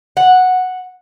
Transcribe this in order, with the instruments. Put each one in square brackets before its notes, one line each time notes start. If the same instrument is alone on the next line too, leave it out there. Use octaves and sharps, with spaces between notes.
[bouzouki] F#5